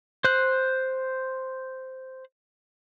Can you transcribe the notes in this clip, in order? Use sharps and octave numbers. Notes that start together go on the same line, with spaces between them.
C5 F#6